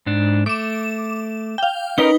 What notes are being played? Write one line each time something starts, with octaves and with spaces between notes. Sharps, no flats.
G#2 D4
A3 D6 E7
F5 G5
C#4 D#4 A#4 B4 G7